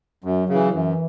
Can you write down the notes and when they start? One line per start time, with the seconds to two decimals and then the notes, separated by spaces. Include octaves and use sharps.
0.24 F#2 F#3
0.49 C#3 E3
0.73 F#2 E3